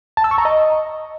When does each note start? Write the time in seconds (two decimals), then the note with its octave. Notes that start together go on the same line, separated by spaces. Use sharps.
0.17 A5
0.24 E6
0.31 C#6
0.38 A#5
0.45 D#5